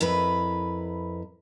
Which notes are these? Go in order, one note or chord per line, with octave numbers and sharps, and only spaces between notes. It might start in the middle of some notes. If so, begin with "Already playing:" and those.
F2 E4 A#4 B4